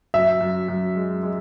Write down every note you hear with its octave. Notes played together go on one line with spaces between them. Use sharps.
F#2 E5
F#2
F#2
G#3
G#3